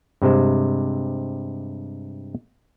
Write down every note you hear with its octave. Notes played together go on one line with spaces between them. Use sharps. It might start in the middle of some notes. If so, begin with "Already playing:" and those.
G2 C3 G#3 C5